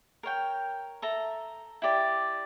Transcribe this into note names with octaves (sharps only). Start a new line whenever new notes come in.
A#4 C#5 G5
A4 E5 A#5
E4 G4 D5